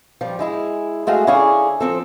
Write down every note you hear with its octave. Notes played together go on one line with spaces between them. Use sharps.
F3 G3
G#3 E4 G#4
G#3 A3 F#4 G#4 F5
D3 C#4 E4 G#4 F5 G#5
F3 C4 A4